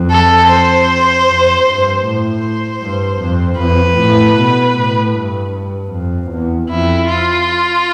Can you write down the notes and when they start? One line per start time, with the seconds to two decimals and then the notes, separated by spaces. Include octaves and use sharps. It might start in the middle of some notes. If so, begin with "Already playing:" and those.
Already playing: F2
0.11 A4
0.50 C5
1.27 F2
1.66 G2
2.05 A2 C5
2.82 G2
3.21 F2
3.59 F2 B4
3.98 A2
4.37 B2
4.76 A2
5.14 G2
5.53 G2
5.92 F2
6.30 E2
6.69 F2 E4
7.08 F4